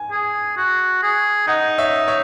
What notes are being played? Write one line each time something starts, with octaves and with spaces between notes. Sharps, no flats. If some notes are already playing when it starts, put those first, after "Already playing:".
Already playing: G#5
G#4
F#4
G#4
D#4 D#5 F#5
C#5 E5
C#5 E5